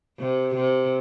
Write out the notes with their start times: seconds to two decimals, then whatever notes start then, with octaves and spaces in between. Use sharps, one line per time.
0.19 C3
0.55 C3